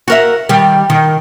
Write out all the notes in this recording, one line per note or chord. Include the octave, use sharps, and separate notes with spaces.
F#4 A#4 E5
D#3 G3
D#3